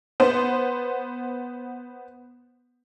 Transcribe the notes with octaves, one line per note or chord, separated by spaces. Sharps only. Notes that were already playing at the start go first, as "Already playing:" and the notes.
B3 C5